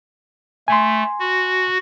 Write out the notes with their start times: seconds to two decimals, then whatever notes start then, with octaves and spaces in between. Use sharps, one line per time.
0.68 A3 G#5 C6
1.20 F#4